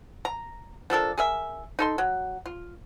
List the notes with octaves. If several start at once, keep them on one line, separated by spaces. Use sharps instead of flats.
A#5
F3 D4 A4 A#4
G#4 A#4 E5
D#4 A4 C6
F#3
F4